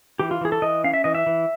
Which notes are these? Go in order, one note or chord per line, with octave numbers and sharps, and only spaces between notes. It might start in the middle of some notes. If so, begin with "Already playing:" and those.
E3 G4
F4
E3 G#4
A4
E3 D#5
C#4 F5
E5
E3 D#5
E5
E3